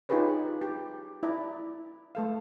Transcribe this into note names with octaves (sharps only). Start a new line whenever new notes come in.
D#4 F4 G4 G#4 B4 C#5
G4
E4 D5 A#5
A3 A4 F5